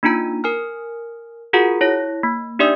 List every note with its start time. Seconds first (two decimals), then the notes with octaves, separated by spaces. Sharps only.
0.03 A#3 D4 D#4 F4 A#5
0.44 A#4 G#5 F6
1.53 F4 F#4 G#4 A#4 F#5 A#5
1.81 E4 C#5 A#6
2.23 A#3
2.59 D4 D#4 G4 D5 E5 D#6